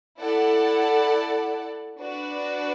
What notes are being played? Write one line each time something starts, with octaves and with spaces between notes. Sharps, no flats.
E4 A4 D5 F#5 A5
D4 F#4 B4 D5